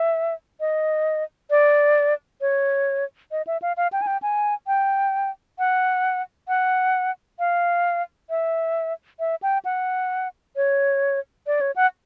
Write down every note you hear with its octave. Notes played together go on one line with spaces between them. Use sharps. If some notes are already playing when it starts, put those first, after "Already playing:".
Already playing: E5
D#5
D5
C#5
D#5
E5
F5
F5
G5
G#5
G5
G#5
G5
F#5
F#5
F5
E5
E5
G5
F#5
C#5
D5
C#5
F#5